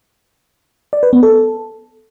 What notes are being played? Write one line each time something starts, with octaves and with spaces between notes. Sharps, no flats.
D5
B4
B3
A4